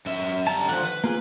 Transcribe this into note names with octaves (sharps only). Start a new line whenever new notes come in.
F#2 E5
G3 A5 A#5
D3 F3 F#5
B4
A#3 F4 G#4